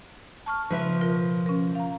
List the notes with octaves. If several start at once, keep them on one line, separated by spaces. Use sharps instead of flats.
A5 C#6 F6
C#3 F3 B4 E5
B2 F4 A#4
C#4 A#4
F5 A#5